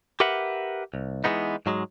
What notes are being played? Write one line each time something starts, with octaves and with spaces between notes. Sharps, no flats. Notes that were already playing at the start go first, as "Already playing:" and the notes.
G4 A#4 B4 E5 F#5
C2
E3 F#3 G#3 B3 D#4
G#2 F#3 G#3